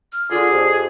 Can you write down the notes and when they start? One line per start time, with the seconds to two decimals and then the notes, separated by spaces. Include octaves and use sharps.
0.12 F6
0.31 D3 F4 G#4
0.50 F2 G4